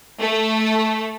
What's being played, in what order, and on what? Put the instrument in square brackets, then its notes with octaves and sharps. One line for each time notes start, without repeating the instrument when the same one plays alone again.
[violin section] A3